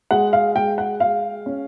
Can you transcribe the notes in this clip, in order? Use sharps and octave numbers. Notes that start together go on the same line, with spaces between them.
G#3 F#5
F5
G#3 G5
F#5
G#3 F5
C#4